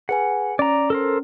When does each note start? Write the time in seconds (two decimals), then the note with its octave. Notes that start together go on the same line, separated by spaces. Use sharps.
0.09 G#4 B4 F#5 G#5
0.59 C#4 D5 A#5
0.90 A4 A#4 C5